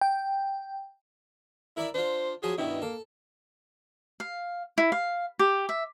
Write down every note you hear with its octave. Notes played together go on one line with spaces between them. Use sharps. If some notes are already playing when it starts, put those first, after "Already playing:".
G5
E4 A#4 D5 E5
D4 F4 C5
F3 F#3 G#4 G#5
G2 B2 D#3 E4
A#3 A4
F5
E4
F5
G4
E5